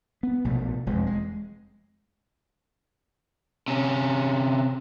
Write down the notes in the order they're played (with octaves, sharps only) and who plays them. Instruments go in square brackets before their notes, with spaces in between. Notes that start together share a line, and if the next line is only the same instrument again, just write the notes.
[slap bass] B3
A#1 B2 A3
E1 F2 G#3
G#3
[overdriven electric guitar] C3 C#4